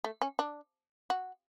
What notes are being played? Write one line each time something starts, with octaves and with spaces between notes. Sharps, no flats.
A3
C#4
D4
F#4